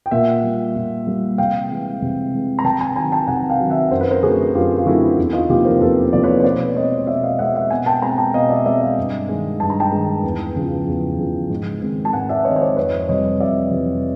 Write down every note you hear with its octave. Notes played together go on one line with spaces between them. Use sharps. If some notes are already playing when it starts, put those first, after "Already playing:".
G5
A#2 E5 F#5
G3 A#3
A#2
G3 A#3
C3 F5 G5
E3 G#3
C3
E3 G#3
A#5
C3 G5 A5
G#5 A#5
D#3 F#3 G#5 A#5
G5 A5
C3 F#5 G#5
F5 G5
D#3 F#3
E5 F#5
F#2 C5
B4
A#4 C5
D3 F#3 A3 C4 F#4 G#4
F#2 F4 G4
F4
D3 F#3 A3 C4 E4 F#4
E2
D#4 F4
C3 F3 A#3 F4 G4
A#4 C5
E2 A4 B4
C3 F3 A#3 D5
B4 C#5
C#5
B2 C5 D5
G#3 C4 C#5 D#5
B2 D5 E5
D#5 F5
G#3 C4 E5 F#5
E5 F#5
B2 F#5 G#5
G5 A5
G#3 C4 G#5 A#5
G5 A5
B2 D#5 F5
D5 E5
G#3 C4 D5 E5
D#5 F5
G2
D#3 G#3
G2 A5
A#5
G5 A5
D#3 G#3
E2
C#3 F3
E2
C#3 F3
G#2
D#3 G#3 C4
A5
G#2 F#5 G#5
D5 E5
D#3 G#3 C4 C#5 D#5
C#5
C5 D5
F2 B4 C#5
C3 E3 G3 C#5 D#5
F2 D5 E5
C3 E3 G3